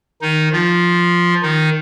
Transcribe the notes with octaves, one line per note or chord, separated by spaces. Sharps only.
D#3 D#4
F3 F4
D#3 D#4